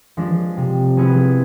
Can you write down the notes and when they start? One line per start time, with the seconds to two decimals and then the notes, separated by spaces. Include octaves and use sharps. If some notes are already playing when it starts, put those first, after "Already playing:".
0.17 F3 G#3 D4
0.57 C3
0.97 F3 B3 E4 G#4